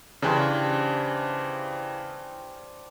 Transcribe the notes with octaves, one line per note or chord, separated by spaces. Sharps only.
C#3 E3 D4 G4 C5